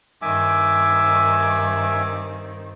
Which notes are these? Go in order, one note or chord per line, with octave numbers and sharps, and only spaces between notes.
G2 D#3 C4 E5 G#5 D6